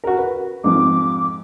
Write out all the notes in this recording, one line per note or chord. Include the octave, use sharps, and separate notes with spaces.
F#4 A#4
B4
F2 G#2 F3 D6